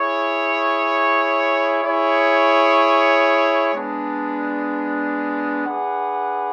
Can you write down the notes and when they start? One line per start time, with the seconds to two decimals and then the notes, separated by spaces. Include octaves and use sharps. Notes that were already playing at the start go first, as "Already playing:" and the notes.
Already playing: E4 G#4 C#5
1.83 E4 G#4 C#5
3.74 G#3 B3 D4
5.66 D4 G#4 B4 F#5